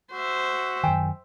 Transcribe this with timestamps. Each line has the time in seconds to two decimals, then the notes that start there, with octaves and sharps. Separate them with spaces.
0.13 F#4 C5 E5
0.83 F#2 D#3 G5 G#5